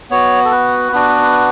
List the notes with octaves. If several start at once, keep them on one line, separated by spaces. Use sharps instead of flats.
B3 F#4 C#5
A4
B4
B3 D4 F#4